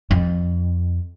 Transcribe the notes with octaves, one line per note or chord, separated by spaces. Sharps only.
F2